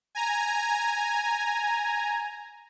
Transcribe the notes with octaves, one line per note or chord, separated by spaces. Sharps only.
G#5 A#5